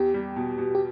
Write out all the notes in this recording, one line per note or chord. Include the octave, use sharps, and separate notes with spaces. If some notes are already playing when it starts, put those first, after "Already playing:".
Already playing: E2 G4
G3
B2
B2
G4